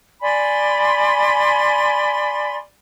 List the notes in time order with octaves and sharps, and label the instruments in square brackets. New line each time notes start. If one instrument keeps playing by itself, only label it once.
[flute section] D5 G#5 B5 C6